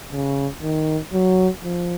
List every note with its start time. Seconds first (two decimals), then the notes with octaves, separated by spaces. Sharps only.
0.11 C#3
0.62 D#3
1.13 F#3
1.64 F3